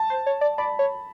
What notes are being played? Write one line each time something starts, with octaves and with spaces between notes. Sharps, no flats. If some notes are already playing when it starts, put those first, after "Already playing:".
Already playing: A5
C5
C#5
D5
D5 B5
C#5